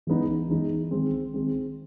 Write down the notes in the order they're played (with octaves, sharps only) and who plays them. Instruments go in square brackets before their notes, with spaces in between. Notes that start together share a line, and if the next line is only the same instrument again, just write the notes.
[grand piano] E3 G#3 B3 D#4
E3 G#3 B3 D#4
D#3 G#3 C4
D#3 G#3 C4